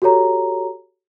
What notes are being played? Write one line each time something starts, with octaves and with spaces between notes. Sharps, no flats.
F#4 G4 A4 C#5 A#5